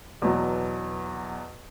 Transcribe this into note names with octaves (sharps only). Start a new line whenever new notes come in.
E2 B2 F#3